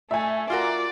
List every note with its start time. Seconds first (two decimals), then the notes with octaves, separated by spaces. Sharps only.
0.11 A3 E5 G#5
0.50 F4 F#4 A#4 D5